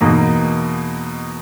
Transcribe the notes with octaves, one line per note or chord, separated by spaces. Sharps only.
E2 B2 A#3 D#4